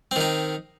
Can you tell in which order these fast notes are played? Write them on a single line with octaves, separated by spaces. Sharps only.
C4 D#3 D#4